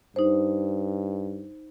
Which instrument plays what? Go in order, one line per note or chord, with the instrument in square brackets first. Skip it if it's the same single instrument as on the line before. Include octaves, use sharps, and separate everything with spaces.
[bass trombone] G2 [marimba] D#4 C5